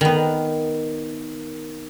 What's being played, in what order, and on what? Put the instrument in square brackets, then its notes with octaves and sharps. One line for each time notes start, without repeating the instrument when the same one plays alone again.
[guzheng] D#3 B3